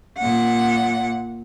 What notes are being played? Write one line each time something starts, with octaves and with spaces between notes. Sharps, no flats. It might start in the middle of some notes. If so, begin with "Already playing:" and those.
A#2 F#5